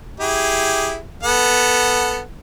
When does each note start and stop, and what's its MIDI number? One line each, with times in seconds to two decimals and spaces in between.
0.20 0.98 64
0.20 0.98 67
0.20 0.98 68
1.23 2.21 59
1.23 2.21 69
1.23 2.21 78